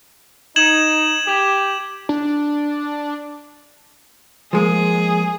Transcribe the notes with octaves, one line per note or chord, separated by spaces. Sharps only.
D#4 G#6 E7 F#7
G4
D4
F3 G#3 A#3 G#4